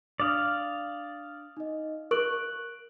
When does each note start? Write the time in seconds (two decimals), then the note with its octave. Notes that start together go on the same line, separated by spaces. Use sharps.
0.20 D4 D5 F5 D#6
1.57 D#4 D#5
2.11 A#4 C#6 F#6 D7 F#7